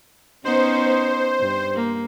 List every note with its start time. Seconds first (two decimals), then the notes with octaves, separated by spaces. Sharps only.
0.45 B3 C#4 D#4 C5
1.40 G2
1.75 A#3